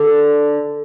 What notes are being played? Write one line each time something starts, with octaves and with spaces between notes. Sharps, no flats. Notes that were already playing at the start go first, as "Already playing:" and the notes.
Already playing: D3